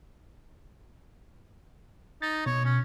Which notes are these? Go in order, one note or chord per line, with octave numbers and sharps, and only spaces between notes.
D#4 A6
B2 C#5
C#4